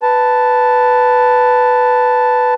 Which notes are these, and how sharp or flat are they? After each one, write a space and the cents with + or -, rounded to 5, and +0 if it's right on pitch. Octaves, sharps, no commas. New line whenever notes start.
B4 +5 A5 +0